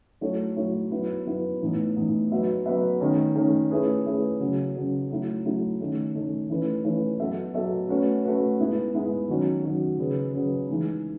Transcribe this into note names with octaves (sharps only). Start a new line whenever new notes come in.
F#3 A3 E4 A4 C#5
F#3 A3 E4 A4 C#5
F#3 B3 E4 B4
F#3 B3 E4 B4
A2 E3 B3 D#4
A2 E3 B3 D#4
F#3 B3 F#4 B4 E5
F#3 B3 F#4 B4 E5
D#3 A3 C#4
D#3 A3 C#4
A3 C#4 E4 G#4 B4
A3 C#4 E4 G#4 B4
C#3 F#3 C#4
C#3 F#3 C#4
F#3 A3 E4
F#3 A3 E4
D#3 A3 C#4
D#3 A3 C#4
E3 A3 C#4 E4 B4
E3 A3 C#4 E4 B4
F#3 B3 F#4 A4 E5
F#3 B3 F#4 A4 E5
A3 C#4 F#4 B4
A3 C#4 F#4 B4
G#3 B3 E4 B4
G#3 B3 E4 B4
D#3 F#3 C#4 F#4
D#3 F#3 C#4 F#4
C#3 F#3 C#4 G#4 B4
C#3 F#3 C#4 G#4 B4
E3 G#3 D#4